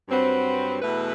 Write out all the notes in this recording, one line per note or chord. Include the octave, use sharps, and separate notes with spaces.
G2 F#3 C4 F#4 B4
E2 B2 A3 E4 B4